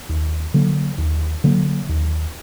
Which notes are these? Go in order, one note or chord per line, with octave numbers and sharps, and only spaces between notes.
D#2
D3 F#3 A#3
D#2
D3 F#3 A#3
D#2